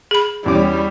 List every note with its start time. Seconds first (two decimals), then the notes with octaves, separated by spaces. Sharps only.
0.11 G#4 B5
0.46 E2 G3 C#4 D6